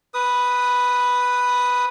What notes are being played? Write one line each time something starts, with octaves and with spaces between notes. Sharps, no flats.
B4 D#6